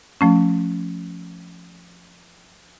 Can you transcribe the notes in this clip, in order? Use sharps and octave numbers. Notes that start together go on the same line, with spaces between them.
F3 A3 C#4